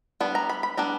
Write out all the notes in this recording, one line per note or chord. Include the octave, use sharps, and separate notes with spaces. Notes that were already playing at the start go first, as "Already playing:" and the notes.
G3 B3 D4
A#5
B5
B5
G3 B3 D4 A#5